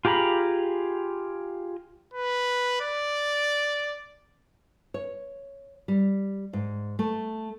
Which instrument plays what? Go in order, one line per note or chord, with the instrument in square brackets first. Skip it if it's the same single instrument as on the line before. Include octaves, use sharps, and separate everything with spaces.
[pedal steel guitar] F4 G4 G#4 A#5 B5
[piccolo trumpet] B4
D5
[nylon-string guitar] C#5
G3
G#2
A3